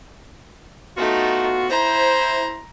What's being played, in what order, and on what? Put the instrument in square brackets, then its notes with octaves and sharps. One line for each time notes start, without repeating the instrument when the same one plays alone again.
[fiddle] A3 D#4 [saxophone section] B3 F4 F#4
[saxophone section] E4 C5 [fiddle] A#5